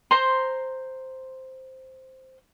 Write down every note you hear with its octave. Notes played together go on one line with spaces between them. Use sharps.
C5 A#5 C6